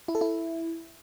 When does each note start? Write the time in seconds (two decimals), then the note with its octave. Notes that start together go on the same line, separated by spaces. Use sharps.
0.08 E4
0.15 A4
0.21 E4